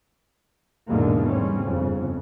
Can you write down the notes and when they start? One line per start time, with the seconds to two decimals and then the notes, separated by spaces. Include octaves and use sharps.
0.88 A1 E2 G#2 B2 D3 A#3
1.29 A1 G3 C4 C#4
1.65 G1 F2 C#3